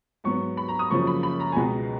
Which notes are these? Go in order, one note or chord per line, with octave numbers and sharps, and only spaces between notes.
G#2 F#3 B3 C#6
B5
A#5
D#6
F#2 C#3 F3 A#3 C#6
B5
B5
A#5
G#5
C#2 B2 G#3 B3 A#5